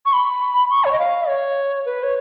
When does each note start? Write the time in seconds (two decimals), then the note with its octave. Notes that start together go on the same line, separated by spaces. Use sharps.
0.06 C#6
0.13 B5
0.70 C#6
0.84 C#5
0.92 D#5
0.99 F5
1.28 C#5
1.86 B4
2.03 C#5